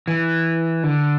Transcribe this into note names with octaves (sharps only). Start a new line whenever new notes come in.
E3
D3